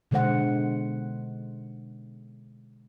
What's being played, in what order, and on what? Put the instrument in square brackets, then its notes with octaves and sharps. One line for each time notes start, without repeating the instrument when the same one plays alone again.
[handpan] B2 D3 G#3 C5 F#5